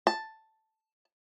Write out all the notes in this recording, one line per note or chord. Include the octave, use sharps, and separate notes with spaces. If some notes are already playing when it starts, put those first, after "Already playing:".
A5